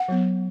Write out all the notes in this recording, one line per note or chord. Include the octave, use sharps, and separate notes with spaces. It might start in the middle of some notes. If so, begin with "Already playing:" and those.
Already playing: F#5
F#3 B3